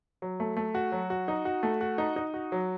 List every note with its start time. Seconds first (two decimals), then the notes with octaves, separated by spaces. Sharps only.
0.22 F#3
0.40 A3
0.57 A3
0.75 F#4
0.92 F#3
1.10 F#4
1.28 D#4
1.45 F#4
1.63 A3
1.81 F#4
1.98 D#4
2.16 D#4
2.34 F#4
2.52 F#3